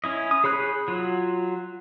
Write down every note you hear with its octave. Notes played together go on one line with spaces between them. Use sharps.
C#4 E4 D#5
D#6
G#4 C#5 B5 F#6 G6
F#3 F4